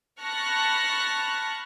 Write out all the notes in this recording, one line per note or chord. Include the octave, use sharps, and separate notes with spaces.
A5 B5 C#6 F6 F#6 A#6